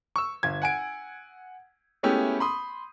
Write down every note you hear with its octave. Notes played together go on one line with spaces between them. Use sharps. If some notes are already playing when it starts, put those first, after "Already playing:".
C#6 E6
G1 G#6
F#5 G#5 D7
G#3 A3 B3 C#4 E4 G4
B5 C6 D#6